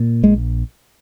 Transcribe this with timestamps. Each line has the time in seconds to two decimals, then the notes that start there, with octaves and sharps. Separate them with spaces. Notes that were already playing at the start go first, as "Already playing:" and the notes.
Already playing: A#2
0.23 A#1 G#3